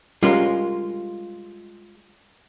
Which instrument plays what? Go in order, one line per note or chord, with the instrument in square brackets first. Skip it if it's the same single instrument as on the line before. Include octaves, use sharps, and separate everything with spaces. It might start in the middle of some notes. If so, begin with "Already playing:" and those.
[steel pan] G3 C#4 A#4 [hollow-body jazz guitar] G#3 F4